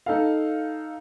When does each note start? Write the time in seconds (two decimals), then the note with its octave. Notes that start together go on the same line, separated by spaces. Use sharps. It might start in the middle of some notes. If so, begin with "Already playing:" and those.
0.06 D#4 A4 F5